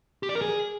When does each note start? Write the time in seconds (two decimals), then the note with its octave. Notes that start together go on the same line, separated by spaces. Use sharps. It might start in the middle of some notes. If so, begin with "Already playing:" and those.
0.23 G4
0.29 D5
0.35 A#4
0.42 G#4